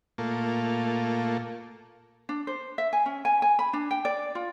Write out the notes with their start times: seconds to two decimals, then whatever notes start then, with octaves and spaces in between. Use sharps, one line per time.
0.18 A#2 A3 A#3 F4
2.29 D4
2.47 C5
2.78 E5
2.93 G#5
3.06 C#4
3.25 G#5
3.42 G#5
3.59 B5
3.73 D4
3.91 G5
4.05 D5
4.35 F4